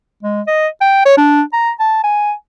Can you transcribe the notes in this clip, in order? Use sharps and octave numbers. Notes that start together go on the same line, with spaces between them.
G#3
D#5
G5
C#5
D4
A#5
A5
G#5